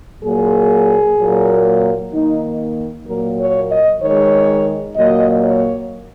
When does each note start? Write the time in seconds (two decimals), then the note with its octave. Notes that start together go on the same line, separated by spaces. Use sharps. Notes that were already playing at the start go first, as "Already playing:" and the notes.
0.22 A#2 F#3 A#3 G#4
1.17 A#2 F#3 A#3
2.12 D#3 A#3 D#4
3.06 A#2 F#3 A#3 A#4
3.38 C#5
3.70 D#5
4.01 D#3 G#3 C#5
4.95 A#2 F#3 A#3 D#5
5.43 C#5